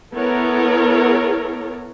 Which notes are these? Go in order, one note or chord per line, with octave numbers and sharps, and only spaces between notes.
B3 E4 A4 A#4 C#5